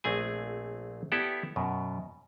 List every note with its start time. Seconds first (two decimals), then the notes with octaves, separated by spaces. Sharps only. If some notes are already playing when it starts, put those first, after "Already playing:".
0.04 A#1 A3 C4 G#4 G#5
1.12 B3 E4 G4 A4 D5
1.56 F#2 B2